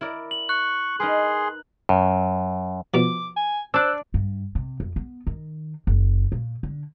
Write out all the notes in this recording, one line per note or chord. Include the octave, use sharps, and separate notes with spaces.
E4 A#4 D5
F#7
C#6 F#6
D#4 G#4 A#4 B4 C6
F#2
B2 F3 D6
G#5
D4 C5 D5 E6 F#6
G2
C3
F2
B3
D#3
F#1
A#2
D3